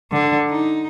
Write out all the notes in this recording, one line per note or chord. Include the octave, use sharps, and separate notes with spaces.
D3
D#4